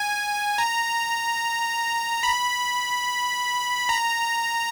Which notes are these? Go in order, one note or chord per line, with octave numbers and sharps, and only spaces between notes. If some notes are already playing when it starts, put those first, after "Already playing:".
Already playing: G#5
A#5
B5
A#5